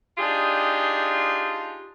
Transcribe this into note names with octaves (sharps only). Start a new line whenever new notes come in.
D4 D#4 F4 G4 G#4